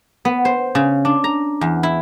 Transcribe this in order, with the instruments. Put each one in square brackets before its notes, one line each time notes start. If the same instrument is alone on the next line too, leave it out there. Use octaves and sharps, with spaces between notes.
[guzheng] B3
C5
C#3
D4
A#5
E2
E4